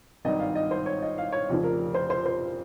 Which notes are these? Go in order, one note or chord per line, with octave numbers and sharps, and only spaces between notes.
G#1 G2 D#3 D#5
F5
D#5
C5
C#5
D#5
F5
C#5
F1 F2 C#3 F3
A#4
C5
C5
C5